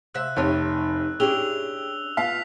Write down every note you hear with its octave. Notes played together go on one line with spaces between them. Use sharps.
C3 C5 E5 E6 F#6
F1 C3 C#4 D#4 G4 C#5 G5
C#4 D4 E4 G4 G#4 E6 F7 G7
B3 F4 F5 B6 F7